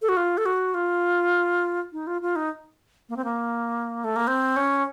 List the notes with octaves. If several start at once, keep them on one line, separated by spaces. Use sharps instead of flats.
A4
F#4
F4
A4
F#4
F4
D#4
F4
F4
D#4
A#3
C4
A#3
A3
A#3
C4
C#4